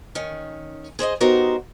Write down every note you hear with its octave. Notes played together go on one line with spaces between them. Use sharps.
D#3 C#4
G#4 C5 D5 D#5
B3 D#4 F#4 G4 A#4 C5